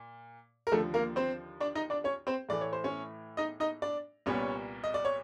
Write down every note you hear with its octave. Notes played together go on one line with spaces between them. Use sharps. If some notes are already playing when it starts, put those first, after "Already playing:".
Already playing: A#2
A#4
D#2 D3 F3 A3 A4
A#3 A#4
C4 C5
D4 D5
D#4 D#5
D4 D5
C#4 C#5
C4 C5
A2 E3 A3 D5
C#5
C5
C#4 C#5
D#4 D#5
D#4 D#5
D4 D5
C2 A#2 G3 B3 C#4 C#5
D#5
D5
C#5